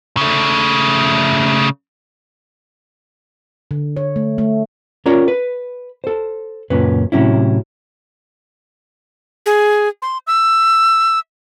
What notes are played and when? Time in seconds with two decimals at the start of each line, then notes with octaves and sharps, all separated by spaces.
0.17 C#3 A3
3.71 D3
3.97 C#5
4.16 A3
4.38 A3
5.06 C#4 F4 A#4 C#5 D5
5.28 B4
6.04 A4 C5
6.70 C#2 F#2 A#2 C#4 B4
7.12 A2 C3 F#3 C#4 E4
9.46 G#4
10.02 C6
10.27 E6